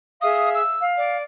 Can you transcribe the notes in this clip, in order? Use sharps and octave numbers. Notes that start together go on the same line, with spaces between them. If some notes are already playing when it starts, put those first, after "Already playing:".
G#4 E5 F5 D#6
E6
F5
D5